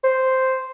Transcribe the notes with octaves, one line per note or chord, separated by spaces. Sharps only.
C5